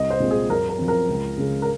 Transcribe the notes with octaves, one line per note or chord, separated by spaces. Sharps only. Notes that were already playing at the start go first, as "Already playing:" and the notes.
Already playing: C2 D#5
C5
A#2 G#3 C4
G#4
F#2 A#4
A#4
F3 C4
A#4
C#2
C#3 G#3
A#4